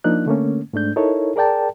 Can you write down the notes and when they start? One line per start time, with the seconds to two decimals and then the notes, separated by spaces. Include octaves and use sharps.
0.04 F3 A#3 D4 D#4 F#6
0.26 D3 A3 A#3 C#4
0.73 G#2 A3 D4 G6
0.96 D#4 E4 A4 A#4 C#5
1.36 G#4 A#4 D5 G5 A5